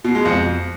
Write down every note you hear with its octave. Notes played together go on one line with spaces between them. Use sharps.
B2
G#3
F2